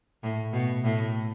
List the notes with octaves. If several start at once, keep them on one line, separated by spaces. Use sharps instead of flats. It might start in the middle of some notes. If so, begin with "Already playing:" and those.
A2
B2
A2